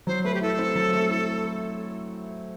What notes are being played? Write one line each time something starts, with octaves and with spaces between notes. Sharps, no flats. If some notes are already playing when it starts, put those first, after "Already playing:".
F#3 C5
A3 B4
G4
E4 A4
C4
F#3
A3
E4